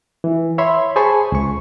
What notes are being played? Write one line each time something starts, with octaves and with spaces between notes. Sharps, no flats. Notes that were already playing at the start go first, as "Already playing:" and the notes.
E3
C#5 E5 B5 C6
G#4 C5 G#5 A5 B5 C#6
C#2 C#6